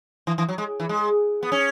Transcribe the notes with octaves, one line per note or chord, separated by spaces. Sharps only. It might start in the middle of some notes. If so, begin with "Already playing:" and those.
E3
E3
F#3
G#3
E3
G#3
B3
C#4